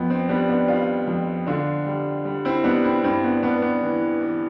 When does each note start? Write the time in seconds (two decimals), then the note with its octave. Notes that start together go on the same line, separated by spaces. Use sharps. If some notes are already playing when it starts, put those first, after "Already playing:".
Already playing: F2 B3
0.10 C4
0.29 G3 B3 D4
0.49 B3 D4
0.68 G3 D4 F4
1.07 F2
1.46 D3 D4 F4
1.87 G3
2.25 G3
2.45 C4 E4
2.64 G3 B3 D4
2.84 C4 E4
3.04 G2 C4 E4
3.23 B3 D4
3.43 G2 B3 D4
3.62 B3 D4
3.82 E3
4.21 E3